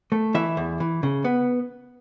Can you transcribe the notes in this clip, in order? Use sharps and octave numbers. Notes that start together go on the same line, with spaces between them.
A3
E3 E5
E2
E3
C#3
B3